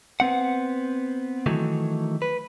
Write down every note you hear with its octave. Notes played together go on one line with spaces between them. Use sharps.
B3 C4 F#5
D#3 E3 F#3 A3
B4